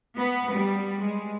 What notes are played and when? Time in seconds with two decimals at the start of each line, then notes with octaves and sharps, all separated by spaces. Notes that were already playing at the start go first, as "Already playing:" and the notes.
0.17 B3
0.53 G3
1.02 G#3